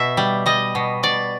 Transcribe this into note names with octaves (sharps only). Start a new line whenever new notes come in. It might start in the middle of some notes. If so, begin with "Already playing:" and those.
Already playing: B2 E5
G3
G3 D#5
B2
B2 D5